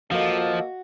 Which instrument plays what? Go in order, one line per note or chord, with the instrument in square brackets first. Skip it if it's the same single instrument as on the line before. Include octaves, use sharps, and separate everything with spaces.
[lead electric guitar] F3 [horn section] A#3 A4 [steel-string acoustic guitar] F#4 [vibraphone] D#5 F5